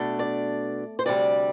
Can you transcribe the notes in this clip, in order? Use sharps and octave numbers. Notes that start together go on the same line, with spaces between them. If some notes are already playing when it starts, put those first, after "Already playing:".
Already playing: B2 A3 D4
D5
C5
D2 C3 G3 D5